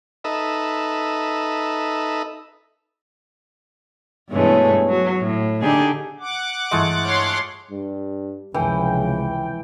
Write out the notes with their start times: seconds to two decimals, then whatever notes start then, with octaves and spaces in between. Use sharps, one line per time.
0.24 D#4 A4 B4 D#5 E5
4.29 G2 B2 E3 G#3 A3 C#4
4.88 F#3
5.21 A2
5.61 D3 D4 D#4 G4 G#4
6.20 F#5 D6
6.71 G2 E3 G#3 A3 F4 E5
7.05 C#5 C6
7.71 G2
8.54 F1 C#2 C#3 E3 G#3 G5